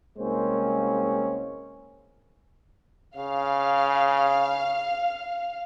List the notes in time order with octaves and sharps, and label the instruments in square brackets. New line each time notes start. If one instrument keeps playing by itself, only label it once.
[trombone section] C2 G#3 A#3 C4 C#4 C5
[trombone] C#3 [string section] F5